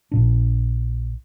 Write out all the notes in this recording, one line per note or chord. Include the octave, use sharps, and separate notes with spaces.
A#1 A#2 D4